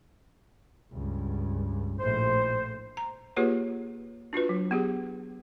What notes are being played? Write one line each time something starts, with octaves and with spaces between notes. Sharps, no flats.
C#2 G2
A#1 A2 C5
A#5
A#3 F4 G4 G#4 B4 C#5
D4 F4 F#4 B4
F#3
B3 G4 G#4